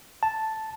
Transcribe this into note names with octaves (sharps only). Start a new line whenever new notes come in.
A5